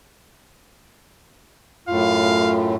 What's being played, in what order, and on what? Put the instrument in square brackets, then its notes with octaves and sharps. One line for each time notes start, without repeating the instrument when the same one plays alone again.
[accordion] F#2 A2 [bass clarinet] F4 [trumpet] F5